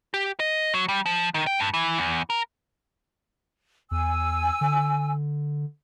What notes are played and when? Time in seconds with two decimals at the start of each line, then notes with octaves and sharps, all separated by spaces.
0.14 G4
0.40 D#5
0.74 F#3
0.89 G3
1.06 F3
1.34 D#3
1.47 G5
1.59 G2
1.74 E3
1.99 E2
2.30 A#4
3.91 E2 G#5 E6
4.61 D3